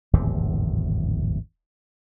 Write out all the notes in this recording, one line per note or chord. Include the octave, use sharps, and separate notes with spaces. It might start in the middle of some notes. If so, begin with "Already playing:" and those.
D1 G#1 E2 C3